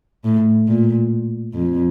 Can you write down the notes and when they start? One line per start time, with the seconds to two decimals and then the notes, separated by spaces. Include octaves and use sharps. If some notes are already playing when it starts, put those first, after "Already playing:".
0.25 A2
0.67 A#2
1.54 F2